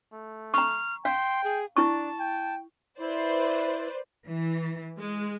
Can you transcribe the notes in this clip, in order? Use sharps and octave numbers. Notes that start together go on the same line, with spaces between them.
A3
A#5 C#6 F6
F5 G5 C6
G#4
D4 E4 A5 C#6
G5
E4 B4 C5 D5
E3
G#3